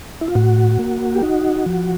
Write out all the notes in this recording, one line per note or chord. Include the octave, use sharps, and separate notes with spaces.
E4
F4
A2 F#4
A#3
G4
D#4 F#4
F3